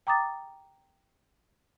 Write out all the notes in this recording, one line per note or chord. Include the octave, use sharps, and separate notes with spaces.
G5 A#5 D6 D#6 A6